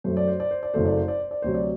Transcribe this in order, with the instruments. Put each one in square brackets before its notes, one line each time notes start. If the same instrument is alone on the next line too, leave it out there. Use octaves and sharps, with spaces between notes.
[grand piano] F#2 F#3 A3 C5
D5
C5
D5
C5
D5
F#1 F#2 F#3 A3 C5
D5
C5
D5
C5
D5
D2 C3 F#3 C5
D5